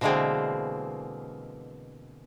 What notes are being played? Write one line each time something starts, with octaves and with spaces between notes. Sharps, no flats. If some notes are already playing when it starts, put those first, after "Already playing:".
B2 D3 E3 G#3 A#3 C4